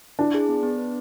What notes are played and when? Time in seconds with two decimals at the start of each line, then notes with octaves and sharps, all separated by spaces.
0.19 D4 E4
0.34 G#4
0.49 B3
0.63 B3
0.78 B4